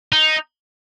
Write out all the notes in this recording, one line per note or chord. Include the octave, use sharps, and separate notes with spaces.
D#4